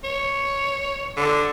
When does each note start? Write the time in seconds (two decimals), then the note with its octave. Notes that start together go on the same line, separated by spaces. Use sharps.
0.04 C#5
1.17 D3